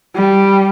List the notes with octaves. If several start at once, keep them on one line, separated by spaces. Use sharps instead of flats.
G3